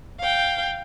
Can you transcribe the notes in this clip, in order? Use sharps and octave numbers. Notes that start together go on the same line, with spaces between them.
F5 G5